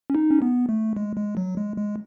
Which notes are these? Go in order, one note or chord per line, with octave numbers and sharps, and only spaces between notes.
C#4
D#4
C#4
B3
A3
G#3
G#3
F#3
G#3
G#3